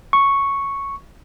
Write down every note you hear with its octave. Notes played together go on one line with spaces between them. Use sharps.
C#6